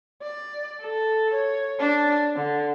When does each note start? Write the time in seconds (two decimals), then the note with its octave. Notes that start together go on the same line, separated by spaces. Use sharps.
0.22 D5
0.81 A4
1.34 C#5
1.80 D4
2.36 D3